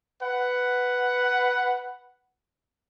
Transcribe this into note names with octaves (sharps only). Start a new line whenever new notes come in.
B4 F#5